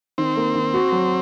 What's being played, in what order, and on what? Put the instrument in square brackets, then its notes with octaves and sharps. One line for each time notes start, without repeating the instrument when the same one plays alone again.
[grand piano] D#3 [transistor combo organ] C4
[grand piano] A#3
D#3
F#4
F#3